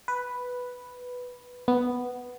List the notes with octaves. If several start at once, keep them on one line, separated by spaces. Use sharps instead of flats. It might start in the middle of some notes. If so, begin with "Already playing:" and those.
B4
B3